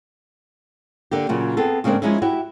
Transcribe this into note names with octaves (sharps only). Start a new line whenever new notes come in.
D3 A#3 G4
A#2 C#3 F#3
B3 C4 G#4 A4
G#2 C#3 A#3 C4 D4
F3 G#3 C#4 D#4 E4
E4 F#4 G4